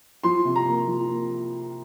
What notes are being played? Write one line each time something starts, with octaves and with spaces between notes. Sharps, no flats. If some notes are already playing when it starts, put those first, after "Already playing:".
F3 C6
C3
A#5
A#3
F3
A#3